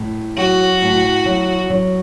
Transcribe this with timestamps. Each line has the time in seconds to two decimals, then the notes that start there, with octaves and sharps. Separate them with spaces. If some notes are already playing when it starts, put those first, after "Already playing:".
Already playing: A2
0.37 F#3 F#4
0.82 A2
1.26 F#3
1.70 F#3